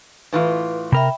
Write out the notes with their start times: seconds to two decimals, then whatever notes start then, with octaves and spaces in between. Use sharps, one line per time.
0.33 A2 E3 F4 B4
0.92 C3 A#4 E5 G5 B5